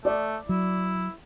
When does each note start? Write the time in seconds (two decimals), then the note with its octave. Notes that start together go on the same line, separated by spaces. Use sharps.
0.05 A3 D5
0.49 F#3 E4